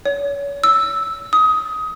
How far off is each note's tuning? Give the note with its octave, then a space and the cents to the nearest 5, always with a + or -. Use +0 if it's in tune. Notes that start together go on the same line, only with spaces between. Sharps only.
C#5 +35
E6 -5
D#6 +20